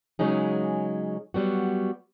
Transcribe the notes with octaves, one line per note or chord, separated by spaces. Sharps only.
C#3 F#3 G#3 C#4 D#4 G#4
F#3 G3 B3 F#4